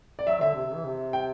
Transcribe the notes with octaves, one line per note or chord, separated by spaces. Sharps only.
D5
F#3 E5
D3 E5
C3
C3
E3
C3
G5